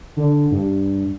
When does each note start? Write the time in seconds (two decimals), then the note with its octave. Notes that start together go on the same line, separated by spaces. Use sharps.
0.17 D3
0.51 G2